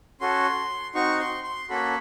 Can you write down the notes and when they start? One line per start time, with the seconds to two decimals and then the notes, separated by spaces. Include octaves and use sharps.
0.21 C#4 F#4 A4 C6
0.95 C4 D#4 F#4 C#6
1.20 C6
1.44 C6
1.69 A#3 C#4 F#4 A4 B5